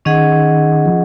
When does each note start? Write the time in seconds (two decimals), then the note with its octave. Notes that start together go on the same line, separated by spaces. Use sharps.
0.05 D#3 C#4 G#4 D#5 F#5
0.86 F3